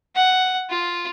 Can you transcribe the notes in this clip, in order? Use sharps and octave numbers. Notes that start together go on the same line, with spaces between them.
F#5
F4